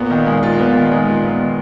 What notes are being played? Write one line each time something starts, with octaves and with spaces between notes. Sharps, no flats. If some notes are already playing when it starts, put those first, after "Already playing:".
Already playing: A#2 B3
D#3
G#3
A#2 F4
B3
D#3
A#2 G#3
F4
B3
D#3